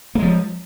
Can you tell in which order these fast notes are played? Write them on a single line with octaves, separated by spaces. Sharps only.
A#3 G#3 F3